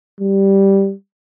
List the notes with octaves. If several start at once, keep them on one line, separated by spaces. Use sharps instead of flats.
G3